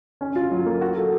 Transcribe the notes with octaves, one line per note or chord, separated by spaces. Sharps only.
C#4
F4
F#3
A#3
F#4
A4